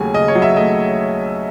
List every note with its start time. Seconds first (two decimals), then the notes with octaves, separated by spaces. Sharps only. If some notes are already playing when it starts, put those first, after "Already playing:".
Already playing: D#2 C#3 F#3 A3 G#5
0.14 C#3 D#5
0.28 C#5
0.35 F#3
0.42 E5
0.56 A3 D#5